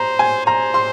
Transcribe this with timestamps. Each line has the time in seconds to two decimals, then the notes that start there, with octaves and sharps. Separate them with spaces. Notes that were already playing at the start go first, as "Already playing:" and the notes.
Already playing: C5 A#5
0.19 G#5
0.46 C5 A#5
0.74 C6